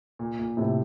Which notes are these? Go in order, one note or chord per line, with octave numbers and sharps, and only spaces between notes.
A#2
A#2
A2 C3